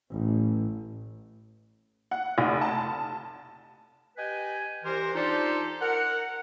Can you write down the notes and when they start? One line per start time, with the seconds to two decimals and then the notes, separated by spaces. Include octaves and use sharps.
0.11 A1
2.11 F#5
2.38 F1
2.61 A5
4.17 G4 B4 D#5 G5 G#5
4.84 C2 E3 G4 A#4 C5 C6
5.14 D4 D#4 F4 G4 A4 C5
5.81 A#4 F#5